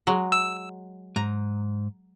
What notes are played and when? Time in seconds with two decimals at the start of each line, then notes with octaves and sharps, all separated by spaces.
0.07 F#3 G#3
0.32 E6
1.16 G#2 A#5